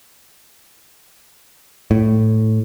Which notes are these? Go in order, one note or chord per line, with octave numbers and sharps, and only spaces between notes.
A2